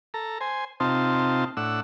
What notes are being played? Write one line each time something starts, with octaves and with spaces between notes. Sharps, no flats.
A4 A#5
C5 G#5
C3 C4 D#4 F4 A5
A2 D4 F#5 E6